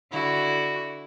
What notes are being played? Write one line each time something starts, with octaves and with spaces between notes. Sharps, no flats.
D3 E4 F#4